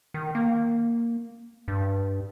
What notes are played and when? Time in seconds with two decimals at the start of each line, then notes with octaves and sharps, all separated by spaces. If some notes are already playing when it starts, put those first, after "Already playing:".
0.14 D#3
0.35 A#3
1.68 G2